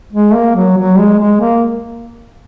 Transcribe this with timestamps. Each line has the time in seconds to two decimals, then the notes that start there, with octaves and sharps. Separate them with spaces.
0.13 G#3
0.34 A#3
0.56 F#3
0.77 F#3
0.98 G#3
1.19 G#3
1.40 A#3